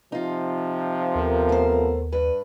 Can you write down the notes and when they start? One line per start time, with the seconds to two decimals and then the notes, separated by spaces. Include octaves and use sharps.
0.12 C3 F3 D#4 F4
1.15 D#2 B3 A4 A#4
1.49 A3 C5
2.12 G2 B4